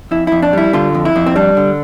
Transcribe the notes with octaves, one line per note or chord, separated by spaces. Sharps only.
F2 E4
F2 E4
D4
G3 E4
D3 F4
F2
E4
F2
C4
G3 D4
D3